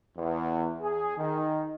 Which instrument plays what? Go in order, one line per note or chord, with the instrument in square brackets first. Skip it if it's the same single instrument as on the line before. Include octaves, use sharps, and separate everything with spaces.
[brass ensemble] E2
G#4
D#3